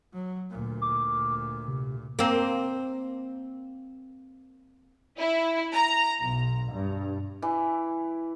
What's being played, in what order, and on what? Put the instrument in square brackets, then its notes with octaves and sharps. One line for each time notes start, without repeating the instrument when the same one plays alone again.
[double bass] F#3
D2 A#2
[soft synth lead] D6
C3
[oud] A#3 C4
[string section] E4
A#5
B1
G2
[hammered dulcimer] E3